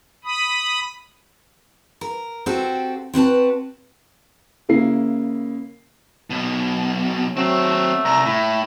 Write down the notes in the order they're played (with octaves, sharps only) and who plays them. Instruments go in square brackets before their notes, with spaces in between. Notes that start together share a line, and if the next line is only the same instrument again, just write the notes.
[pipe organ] B5 D#6
[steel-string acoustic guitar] A#4
C4 F#4 G4 A4
C4 F#4 B4 A5
[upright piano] C#3 A#3 E4 C7
[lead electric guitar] B1 B2
[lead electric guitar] D#2 C4 [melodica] F#3 [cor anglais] A3
[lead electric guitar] C2 [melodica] A#5
[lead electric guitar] A2 [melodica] E4